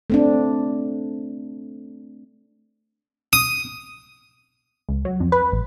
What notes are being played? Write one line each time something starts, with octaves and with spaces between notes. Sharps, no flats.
A3 C4 D4
D#6
C#2
F#3
F2
B4
A1